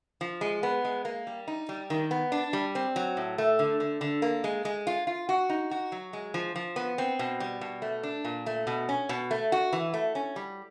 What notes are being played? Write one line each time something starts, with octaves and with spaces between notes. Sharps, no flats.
F3
G#3
B3
G#3
A#3
G3
D#4
G3
D#3
B3
D4
G3
C4
F#3
A2
A3
D3
D3
D3
A#3
G#3
G#3
F4
F4
F#4
D#4
F#4
F#3
G#3
F3
F3
B3
C4
B2
G3
B2
A3
D4
A#2
A3
B2
C#4
B2
A3
F#4
E3
A3
C#4
G3